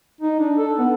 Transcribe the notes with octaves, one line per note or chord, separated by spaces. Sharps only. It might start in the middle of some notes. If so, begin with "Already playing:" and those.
D#4
D4
A4
B3